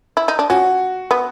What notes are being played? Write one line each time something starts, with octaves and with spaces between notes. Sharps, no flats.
E4
D#4
D4
C#4 F#4
B3